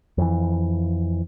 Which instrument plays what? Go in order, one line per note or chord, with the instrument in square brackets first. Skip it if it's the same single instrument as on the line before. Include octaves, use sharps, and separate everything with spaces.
[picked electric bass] F2 E3